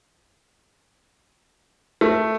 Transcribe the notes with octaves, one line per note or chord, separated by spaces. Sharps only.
A3